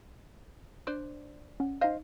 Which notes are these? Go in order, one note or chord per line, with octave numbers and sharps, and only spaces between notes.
D4 C5 D5
C#4 F#5
D#4 C5 D#5 F5 C7